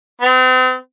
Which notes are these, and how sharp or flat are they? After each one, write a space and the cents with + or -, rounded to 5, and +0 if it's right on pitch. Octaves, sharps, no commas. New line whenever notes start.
C4 -40